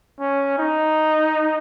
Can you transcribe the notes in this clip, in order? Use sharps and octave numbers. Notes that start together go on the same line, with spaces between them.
C#4
D#4